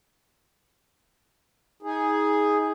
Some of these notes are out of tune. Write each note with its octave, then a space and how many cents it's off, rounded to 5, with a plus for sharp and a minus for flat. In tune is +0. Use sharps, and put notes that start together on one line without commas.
D#4 +35 G#4 +0